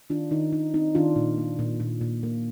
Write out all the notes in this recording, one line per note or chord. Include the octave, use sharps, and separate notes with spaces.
D#3 D4 F4
D#3 D#4
D#3 D#4
C4 D#4
D#3 D4 F4
A#2
A#3
A#2
A#2
A#2
A#3